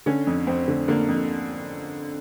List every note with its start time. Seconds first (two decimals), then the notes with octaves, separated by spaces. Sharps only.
0.06 D3 C#4
0.27 F2
0.47 F2 C4
0.68 D3
0.88 D3 A#3
1.08 F2